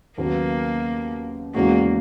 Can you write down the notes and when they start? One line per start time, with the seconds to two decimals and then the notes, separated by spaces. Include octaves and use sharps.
0.18 D#2 C#3 F#3 A#3 B3
1.54 E2 C#3 G#3 A#3 C#4 F#4